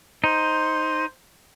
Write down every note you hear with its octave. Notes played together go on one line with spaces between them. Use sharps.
D#4 C5